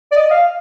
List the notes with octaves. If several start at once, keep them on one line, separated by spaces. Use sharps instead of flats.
D5
D#5
F5